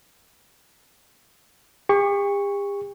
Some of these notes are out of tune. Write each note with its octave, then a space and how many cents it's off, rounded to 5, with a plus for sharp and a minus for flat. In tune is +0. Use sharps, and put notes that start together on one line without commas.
G4 +45 C#6 +0